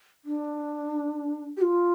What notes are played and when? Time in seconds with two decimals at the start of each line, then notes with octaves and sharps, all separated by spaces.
0.25 D4
1.57 G4
1.61 F4